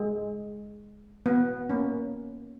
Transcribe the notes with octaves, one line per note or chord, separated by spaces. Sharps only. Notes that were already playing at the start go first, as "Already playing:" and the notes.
Already playing: G#3
B3
A#3 C#4